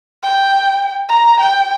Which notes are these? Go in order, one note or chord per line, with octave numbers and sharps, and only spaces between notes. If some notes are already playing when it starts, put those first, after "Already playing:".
G5
A#5
G5